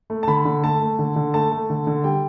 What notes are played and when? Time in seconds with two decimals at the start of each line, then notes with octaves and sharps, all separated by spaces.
0.10 A3
0.23 A5
0.27 D3 B5
0.45 D3
0.63 A3 A5
0.81 A3
0.99 D3
1.16 D3
1.34 A3 A5
1.52 A3
1.70 D3
1.87 D3
2.04 G3 G5